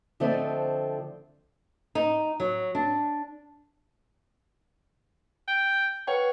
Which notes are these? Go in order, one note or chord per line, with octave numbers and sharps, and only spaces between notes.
D3 F3 A3 C4 D#5
D#4
F#3
D4
G5
B4 C#5 F#5 G5